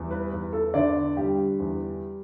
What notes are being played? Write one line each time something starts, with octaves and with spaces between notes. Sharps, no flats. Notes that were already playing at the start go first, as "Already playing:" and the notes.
Already playing: E2 G3
B4
E2
A4
D3 D5
G3 G4
E2